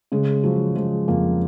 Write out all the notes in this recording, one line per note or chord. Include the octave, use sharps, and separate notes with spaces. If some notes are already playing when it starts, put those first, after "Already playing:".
C#3 G#3
F3 F#3
F3 G#3
F2 A#3